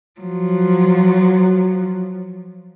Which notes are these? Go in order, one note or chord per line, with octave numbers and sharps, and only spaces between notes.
F3 F#3